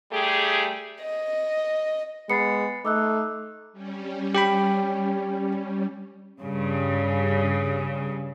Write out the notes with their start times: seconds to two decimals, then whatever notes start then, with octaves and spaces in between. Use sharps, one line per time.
0.12 G3 A3 G4 G#4
1.02 D#5
2.30 G#3 B3 A6 C7 C#7
2.85 A3 D#4 D6 E6 F#6
3.73 G3 C#4
4.35 G4 G5 B5
6.41 G2 C#3